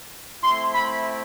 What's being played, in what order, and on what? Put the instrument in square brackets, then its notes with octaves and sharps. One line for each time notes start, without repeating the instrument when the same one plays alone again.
[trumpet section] A3 C4 E4 C6
B5